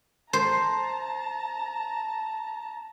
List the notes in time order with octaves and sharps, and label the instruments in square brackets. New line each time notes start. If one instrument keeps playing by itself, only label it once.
[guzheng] C5 [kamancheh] A5 A#5